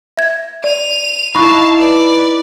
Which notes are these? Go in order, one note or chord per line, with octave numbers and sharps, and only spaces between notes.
E5 G#6
D5 D#7 F7
D#4 E4 F5 A5 B5 C#6 F#6
B4 D5